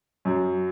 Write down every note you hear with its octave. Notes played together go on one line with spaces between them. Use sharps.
F#2 F#3